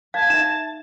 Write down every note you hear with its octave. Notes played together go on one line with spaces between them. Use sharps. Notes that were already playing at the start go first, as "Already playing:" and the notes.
F5 A5 G#6
D#4 E5 E7